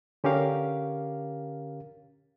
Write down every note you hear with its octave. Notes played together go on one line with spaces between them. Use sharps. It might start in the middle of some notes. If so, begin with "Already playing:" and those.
D3 C#4 G4 A#4 F5